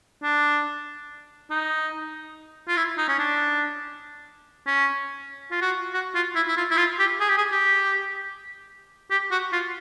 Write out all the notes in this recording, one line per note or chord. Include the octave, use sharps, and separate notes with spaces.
D4
D#4
F4
E4
D#4
C#4
D4
C#4
F4
F#4
F#4
F4
E4
E4
F4
E4
F4
G4
G#4
G4
G#4
G4
G4
F#4
F4